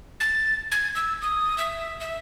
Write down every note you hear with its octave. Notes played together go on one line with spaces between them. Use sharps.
A6
G#6
E6
D#6
E5
E5